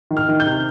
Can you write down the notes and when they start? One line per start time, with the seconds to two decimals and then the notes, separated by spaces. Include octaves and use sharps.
0.11 D#3
0.17 F6
0.29 D#3
0.40 G6
0.46 C3